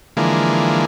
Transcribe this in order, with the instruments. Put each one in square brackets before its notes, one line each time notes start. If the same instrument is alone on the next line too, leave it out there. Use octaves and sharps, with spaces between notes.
[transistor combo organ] D3 E3 F3 G#3 A#3